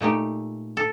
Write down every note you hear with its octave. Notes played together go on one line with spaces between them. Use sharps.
A#2 A3 D#4 G4
A4